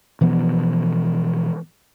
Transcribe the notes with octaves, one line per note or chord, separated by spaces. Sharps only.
B2 E3 F3 B3